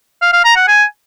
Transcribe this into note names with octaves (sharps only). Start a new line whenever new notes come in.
F5
F5
A#5
F#5
G#5